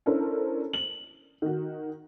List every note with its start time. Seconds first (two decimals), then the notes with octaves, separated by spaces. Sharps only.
0.06 C#4 D4 E4 A4 A#4 C5
0.73 F#7
1.42 D#3 F#4